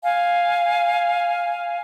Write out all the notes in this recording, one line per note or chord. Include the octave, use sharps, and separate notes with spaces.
F5 G#5